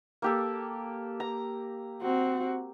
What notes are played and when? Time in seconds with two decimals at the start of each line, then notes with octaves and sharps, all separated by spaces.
0.22 A#3 G4 A4
1.20 A#5
2.02 C4 F#4